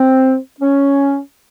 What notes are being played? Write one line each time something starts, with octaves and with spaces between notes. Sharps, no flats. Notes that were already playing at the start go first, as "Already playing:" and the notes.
Already playing: C4
C#4